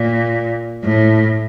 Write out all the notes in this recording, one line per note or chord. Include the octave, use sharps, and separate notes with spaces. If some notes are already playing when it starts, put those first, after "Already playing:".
Already playing: A#2
A2